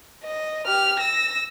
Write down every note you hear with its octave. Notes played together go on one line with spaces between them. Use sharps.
D#5
G4 F6
E6 A#6